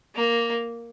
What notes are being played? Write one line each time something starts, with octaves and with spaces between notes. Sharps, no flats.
A#3